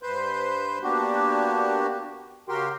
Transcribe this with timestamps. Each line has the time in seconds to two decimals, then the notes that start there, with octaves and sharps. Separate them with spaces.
0.03 G2 B4 C5 C6 G6
0.83 A#3 B3 D4 F#4 G4
2.49 C#3 F#4 G4 A#4 G5 C6